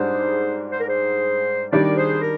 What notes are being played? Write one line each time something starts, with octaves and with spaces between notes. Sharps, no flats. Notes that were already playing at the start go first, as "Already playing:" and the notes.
Already playing: G#2 G3 D4 G#4 C5
C5
A#4
G#4 C5
D#3 G3 D4 A#4 D5
G#4 C5
A#4